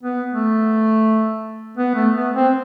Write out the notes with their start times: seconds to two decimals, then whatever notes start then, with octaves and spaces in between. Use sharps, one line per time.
0.03 B3
0.33 A3
1.77 B3
1.95 A3
2.15 B3
2.35 C4